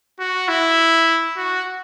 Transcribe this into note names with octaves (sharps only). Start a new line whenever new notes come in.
F#4
E4
F#4